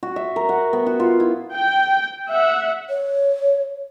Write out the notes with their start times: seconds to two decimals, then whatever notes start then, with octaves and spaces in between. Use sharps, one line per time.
0.03 F#4
0.16 E5
0.36 A#4
0.49 F#5
0.73 B3
0.86 F#4
1.00 F4
1.20 E4
1.55 G5
2.31 E5 F#5
2.89 C#5